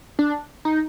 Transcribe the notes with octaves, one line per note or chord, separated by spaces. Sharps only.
D4
D#4